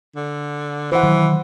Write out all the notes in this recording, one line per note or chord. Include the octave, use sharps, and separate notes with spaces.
D3
E3 C5 F#5
D#3 F#3